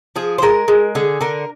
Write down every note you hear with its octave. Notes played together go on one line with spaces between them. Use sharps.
F3 G#4
C5
G#3 A#4
G#3
D3 G#4
D3 A#4